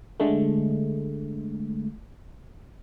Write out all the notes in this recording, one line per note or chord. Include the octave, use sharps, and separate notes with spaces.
D3 G#3 A3